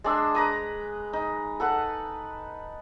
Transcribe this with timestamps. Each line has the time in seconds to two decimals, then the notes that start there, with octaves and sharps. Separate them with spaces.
0.04 G#3 D4 E6
0.35 B4 A#5 D#6
1.13 D#4
1.60 A4 B4 F#5